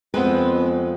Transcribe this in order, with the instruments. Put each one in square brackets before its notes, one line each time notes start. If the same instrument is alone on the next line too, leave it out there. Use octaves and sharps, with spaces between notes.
[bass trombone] F2 [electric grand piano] G#3 [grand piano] B3 C4 G5 [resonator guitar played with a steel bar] B4